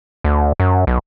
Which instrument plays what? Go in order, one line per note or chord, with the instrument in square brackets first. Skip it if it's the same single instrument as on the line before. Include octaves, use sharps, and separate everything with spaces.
[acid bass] D2
F#2
B1